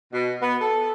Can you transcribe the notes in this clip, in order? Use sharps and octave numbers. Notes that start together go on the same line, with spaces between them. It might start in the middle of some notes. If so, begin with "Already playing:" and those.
B2
B3
A4